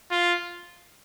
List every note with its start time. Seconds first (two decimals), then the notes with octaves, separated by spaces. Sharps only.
0.11 F4